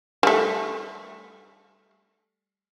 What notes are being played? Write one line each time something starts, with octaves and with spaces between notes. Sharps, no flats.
G3 A3